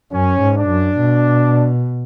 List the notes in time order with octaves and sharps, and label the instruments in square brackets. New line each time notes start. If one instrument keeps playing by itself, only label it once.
[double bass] F#2 [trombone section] C#4
[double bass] G#2
[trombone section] D4
[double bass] F#2
B2